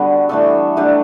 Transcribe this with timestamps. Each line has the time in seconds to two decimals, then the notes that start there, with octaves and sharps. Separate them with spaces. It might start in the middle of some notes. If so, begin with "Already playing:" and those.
Already playing: D3 G3 B3 F#4
0.29 E3 A3 D4 A4
0.77 F#3 A3 D4 G4